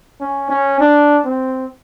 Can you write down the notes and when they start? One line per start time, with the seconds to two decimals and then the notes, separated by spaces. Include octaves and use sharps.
0.21 C#4
0.50 C#4
0.80 D4
1.26 C4